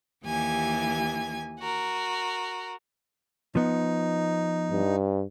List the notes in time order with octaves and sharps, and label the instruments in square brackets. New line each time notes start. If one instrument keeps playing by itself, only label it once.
[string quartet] D#2 E3 G4 G#5 G#6
F#4 A#4
[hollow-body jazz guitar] F3 B3 [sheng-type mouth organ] D#4
[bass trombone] G2